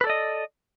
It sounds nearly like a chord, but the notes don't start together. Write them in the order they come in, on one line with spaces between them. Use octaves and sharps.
B4 A4 D5 D#5